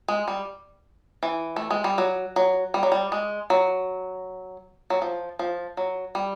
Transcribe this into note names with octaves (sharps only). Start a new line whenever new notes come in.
G#3
G3
E3
A3
G#3
G3
F#3
F#3
G3
F#3
G3
G#3
F#3
F#3
F3
F3
F#3
G3